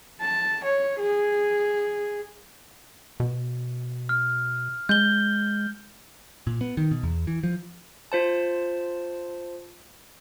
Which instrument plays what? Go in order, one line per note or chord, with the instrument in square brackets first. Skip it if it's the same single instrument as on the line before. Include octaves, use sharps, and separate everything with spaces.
[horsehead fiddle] A5
C#5
G#4
[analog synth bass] B2
[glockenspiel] F6
[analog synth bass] G#3 [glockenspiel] G6 G7
[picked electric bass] A#2
B3
D#3
B2
E2
E3
F3
[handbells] F4 C5 A5